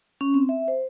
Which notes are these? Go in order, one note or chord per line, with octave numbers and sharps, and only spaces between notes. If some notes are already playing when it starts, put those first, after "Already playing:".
C#4
C4
E5
C5